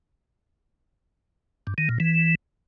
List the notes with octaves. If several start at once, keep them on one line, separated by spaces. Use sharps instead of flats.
G2
D#3
A#2
E3